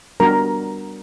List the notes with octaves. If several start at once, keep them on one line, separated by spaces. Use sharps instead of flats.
G3 B3 D4 F#4 A#4 A#5